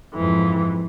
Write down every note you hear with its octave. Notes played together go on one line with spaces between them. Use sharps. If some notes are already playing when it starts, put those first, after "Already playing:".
F2 G#2 E3